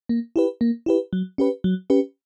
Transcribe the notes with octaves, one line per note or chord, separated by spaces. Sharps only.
A#3
E4 G4 B4
A#3
E4 G4 B4
F#3
C#4 G4 B4
F#3
C#4 G4 B4